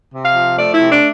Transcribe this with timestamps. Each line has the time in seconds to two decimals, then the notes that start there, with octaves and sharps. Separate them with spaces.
0.13 C3
0.24 F5
0.35 F3
0.57 A3 D5
0.74 E4
0.79 C3
0.90 D4